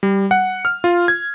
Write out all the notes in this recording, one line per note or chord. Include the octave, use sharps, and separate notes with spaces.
G3
F#5
F6
F4
G#6